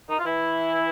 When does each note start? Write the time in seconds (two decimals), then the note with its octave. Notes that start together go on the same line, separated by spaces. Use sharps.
0.09 D#3 D#4
0.19 F4
0.25 E3 E4